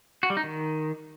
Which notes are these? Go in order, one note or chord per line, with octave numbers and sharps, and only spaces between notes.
F#4
G3
D#4
D#3